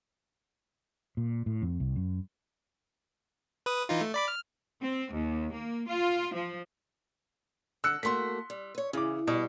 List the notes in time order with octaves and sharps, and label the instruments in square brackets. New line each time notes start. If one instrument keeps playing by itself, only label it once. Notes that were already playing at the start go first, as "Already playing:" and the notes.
[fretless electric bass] A#2
A2
F2
C2
F#2
[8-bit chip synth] B4 D#6
E3 D#4 F4
A3
D5 B5 D6
F6
[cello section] C4
D#2
A#3
F4
F3
[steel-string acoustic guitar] D3 [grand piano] E6 F#6 C#7
[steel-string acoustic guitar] A3 A#3 F#4 [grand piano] C6 B6
[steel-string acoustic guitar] G3
B4 C#5
[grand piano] C#3 D6 [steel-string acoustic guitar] E3
[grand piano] B2 [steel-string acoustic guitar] G3